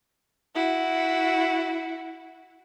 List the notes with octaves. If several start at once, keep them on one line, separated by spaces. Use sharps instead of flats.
E4 F#4